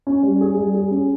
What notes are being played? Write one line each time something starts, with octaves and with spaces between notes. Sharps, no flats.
C#4
G3
G#4
G3
G#4
C#4